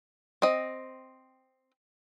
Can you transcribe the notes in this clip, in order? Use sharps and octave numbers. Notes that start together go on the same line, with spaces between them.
C4 D#5